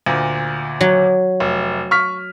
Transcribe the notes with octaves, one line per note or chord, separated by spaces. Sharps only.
D2 A#2
F#3
F1
C#6 F6 B6